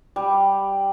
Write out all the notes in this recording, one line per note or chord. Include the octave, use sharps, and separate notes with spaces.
G3